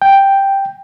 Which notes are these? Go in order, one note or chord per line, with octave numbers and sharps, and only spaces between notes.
G5